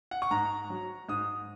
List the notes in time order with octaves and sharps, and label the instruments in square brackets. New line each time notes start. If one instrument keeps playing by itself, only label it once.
[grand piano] F#5
C#6
G#2 A#5
F#3
G#2 D#6